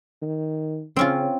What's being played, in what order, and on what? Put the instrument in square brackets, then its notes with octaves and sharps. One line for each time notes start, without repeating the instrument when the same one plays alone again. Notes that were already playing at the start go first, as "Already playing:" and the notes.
[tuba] D#3
[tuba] C#3 [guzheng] C4 C#4 F4